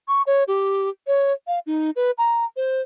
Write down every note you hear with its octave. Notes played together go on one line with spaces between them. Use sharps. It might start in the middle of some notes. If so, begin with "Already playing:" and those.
C#6
C#5
G4
C#5
F5
D#4
B4
A#5
C5